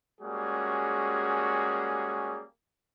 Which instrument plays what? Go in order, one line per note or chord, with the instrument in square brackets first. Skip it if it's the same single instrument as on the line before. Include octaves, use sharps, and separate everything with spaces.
[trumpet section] G3 G#3 A#3 C#4 F#4 G#4